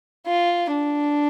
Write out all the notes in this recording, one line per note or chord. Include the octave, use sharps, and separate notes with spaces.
F4
D4